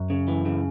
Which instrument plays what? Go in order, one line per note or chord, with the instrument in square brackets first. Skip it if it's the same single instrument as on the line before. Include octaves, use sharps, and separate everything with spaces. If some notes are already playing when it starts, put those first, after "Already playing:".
Already playing: [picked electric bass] F#2
[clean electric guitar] C#3
E3
C#3